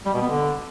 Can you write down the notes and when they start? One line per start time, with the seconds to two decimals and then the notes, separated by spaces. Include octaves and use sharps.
0.06 G3
0.13 B2
0.21 B3
0.29 D3